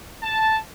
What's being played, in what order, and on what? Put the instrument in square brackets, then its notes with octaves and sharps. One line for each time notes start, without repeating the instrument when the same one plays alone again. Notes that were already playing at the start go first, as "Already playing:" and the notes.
[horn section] A5